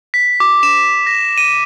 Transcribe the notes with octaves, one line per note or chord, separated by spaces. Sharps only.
B6
D6
E7
A#6
D#7